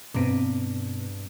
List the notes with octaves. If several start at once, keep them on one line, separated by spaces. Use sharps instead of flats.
G2 B2 B3 C4